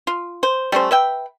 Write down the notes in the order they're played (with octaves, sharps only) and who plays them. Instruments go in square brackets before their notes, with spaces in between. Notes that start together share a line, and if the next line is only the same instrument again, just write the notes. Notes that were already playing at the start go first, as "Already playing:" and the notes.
[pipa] F4
C5
G3 A3 C#4 C5
B4 E5 G5